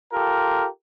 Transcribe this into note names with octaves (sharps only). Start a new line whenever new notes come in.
F4 G4 A4 A#4